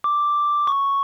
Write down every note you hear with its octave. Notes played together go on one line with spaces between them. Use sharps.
D6
C#6